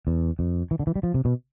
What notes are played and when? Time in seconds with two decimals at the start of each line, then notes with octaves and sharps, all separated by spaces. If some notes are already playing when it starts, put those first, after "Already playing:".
0.07 E2
0.39 F2
0.71 E3
0.79 D3
0.87 E3
0.96 G3
1.03 F3
1.14 C3
1.25 B2